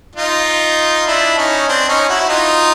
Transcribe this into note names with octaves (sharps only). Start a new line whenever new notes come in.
D#4 F4
D4 E4
C#4 D#4
C4 D4
C#4 D#4
E4 F#4
D#4 F4